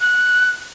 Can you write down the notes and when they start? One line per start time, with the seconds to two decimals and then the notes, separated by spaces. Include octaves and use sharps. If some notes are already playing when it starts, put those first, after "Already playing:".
0.01 F#6